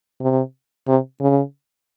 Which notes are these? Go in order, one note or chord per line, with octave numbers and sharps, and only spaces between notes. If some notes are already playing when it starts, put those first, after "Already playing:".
C3
C3
C#3